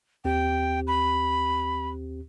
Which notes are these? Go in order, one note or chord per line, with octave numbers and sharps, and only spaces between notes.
D#2 C4 G4 G5
B5